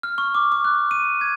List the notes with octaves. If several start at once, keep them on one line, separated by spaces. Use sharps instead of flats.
F6
C#6
D6
D6
F#6
D#7
G#6